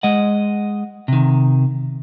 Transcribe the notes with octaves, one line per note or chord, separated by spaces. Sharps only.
G#3 D#5 F#5
C3 D#3